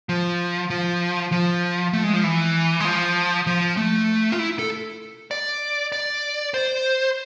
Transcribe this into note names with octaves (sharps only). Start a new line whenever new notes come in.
F3
F3
F3
A3
G#3
F3
E3
G#3
F3
F3
A3
F4
E4
A4
D5
D5
C5